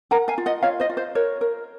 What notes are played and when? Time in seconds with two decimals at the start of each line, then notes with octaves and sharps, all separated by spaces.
0.11 A#4 F#5 A#5
0.28 F5 G#5
0.38 F4
0.46 D#5 F#5
0.63 F4 C#5 F5
0.80 C5 D#5
0.89 F4
0.97 C5
1.15 A#4 C#5
1.41 A#4